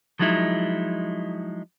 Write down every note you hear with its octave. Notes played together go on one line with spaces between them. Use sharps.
F3 F#3 G#3 D#4 E4